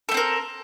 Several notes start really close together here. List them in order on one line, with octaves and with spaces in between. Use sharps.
A4 A3 C4 A#4